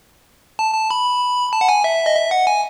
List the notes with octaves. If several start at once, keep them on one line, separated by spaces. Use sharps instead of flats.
A5
A5
B5
A5
F#5
G#5
E5
D#5
E5
F#5
G#5